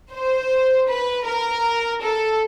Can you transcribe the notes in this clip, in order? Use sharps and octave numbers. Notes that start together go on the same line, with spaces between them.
C5
B4
A#4
A4